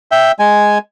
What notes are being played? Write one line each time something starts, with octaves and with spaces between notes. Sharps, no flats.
E5 G5
G#3 G#5